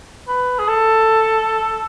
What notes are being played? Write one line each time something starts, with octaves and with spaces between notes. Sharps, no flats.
B4
G#4
A4